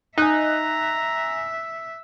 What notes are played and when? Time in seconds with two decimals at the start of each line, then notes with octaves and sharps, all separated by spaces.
0.18 D#4 E5 G#5 A#5 F#6